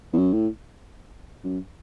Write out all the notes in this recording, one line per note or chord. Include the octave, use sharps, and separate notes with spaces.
E2
F#2
A2
F#2